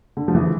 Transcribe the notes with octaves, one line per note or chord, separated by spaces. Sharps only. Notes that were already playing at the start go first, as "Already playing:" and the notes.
D3
F3
E3